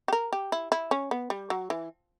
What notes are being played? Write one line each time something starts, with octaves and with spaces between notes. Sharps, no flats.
G4
A#4
G4
E4
E4
C#4
B3
G3
F#3
E3